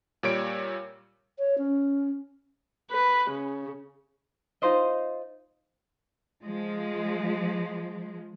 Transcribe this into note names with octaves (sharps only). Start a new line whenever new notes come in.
A#2 G3 C#5 D7
C#5
C#4
B4
C#3
D#4 F4 C5 D#5
F3 G#3